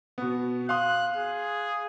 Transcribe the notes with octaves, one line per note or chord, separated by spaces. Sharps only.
B2 B3
F5 C6 D#6 F#6
G#4